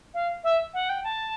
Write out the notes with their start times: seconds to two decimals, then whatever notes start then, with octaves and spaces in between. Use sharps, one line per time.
0.14 F5
0.44 E5
0.74 F#5
0.89 G5
1.04 A5